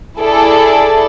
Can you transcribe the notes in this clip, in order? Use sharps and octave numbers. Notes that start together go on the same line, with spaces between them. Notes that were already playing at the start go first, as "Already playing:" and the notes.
E4 G#4 A4 D5